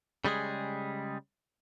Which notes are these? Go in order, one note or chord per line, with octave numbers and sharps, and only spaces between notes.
C#3 G3 G#3 G#4